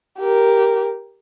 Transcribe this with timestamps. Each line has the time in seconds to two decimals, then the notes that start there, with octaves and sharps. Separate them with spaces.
0.19 G4 A#4